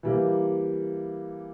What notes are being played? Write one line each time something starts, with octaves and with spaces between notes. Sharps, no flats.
E3 G3 A#3